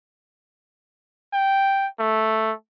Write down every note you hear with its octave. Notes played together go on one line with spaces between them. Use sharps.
G5
A3